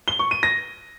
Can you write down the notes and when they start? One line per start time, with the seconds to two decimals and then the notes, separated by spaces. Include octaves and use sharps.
0.08 G7
0.19 C#6
0.31 D#7
0.43 A#6